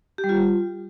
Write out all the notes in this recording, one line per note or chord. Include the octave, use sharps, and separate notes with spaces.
G4
G3
F4